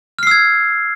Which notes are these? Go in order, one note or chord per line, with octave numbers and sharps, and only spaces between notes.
E6 F6 G#6 C7